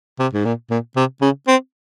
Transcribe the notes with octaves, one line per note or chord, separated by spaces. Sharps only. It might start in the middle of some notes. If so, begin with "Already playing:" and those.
C3
G#2
A#2
A#2
C3
C#3
C4